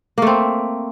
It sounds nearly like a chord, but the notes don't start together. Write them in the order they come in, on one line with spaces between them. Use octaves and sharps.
A#3 A3 C4